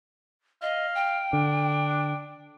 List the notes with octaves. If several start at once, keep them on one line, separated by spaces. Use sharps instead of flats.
D#5 F5
G5
D3 D4